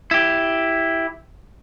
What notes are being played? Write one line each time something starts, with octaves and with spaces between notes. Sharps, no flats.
E4 G4